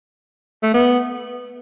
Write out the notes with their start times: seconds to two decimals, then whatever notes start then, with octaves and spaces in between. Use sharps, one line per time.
0.63 A3
0.74 B3